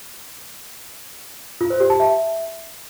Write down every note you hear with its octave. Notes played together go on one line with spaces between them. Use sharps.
F4
C5
G4
A5
E5